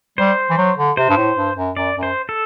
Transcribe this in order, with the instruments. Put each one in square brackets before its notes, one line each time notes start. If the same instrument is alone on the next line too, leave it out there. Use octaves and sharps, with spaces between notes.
[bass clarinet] G3 [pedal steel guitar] C5
[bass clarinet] E3
F#3
D3
[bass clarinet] C3 [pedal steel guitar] C5
[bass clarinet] G2
A2
G2
F#2
[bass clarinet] F#2 [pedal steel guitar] D5
[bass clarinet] F#2
[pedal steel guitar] C5
A4